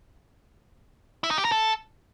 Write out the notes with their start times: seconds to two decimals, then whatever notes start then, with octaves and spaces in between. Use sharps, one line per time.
1.24 E4
1.31 D#4
1.38 G4
1.45 A#4
1.52 A4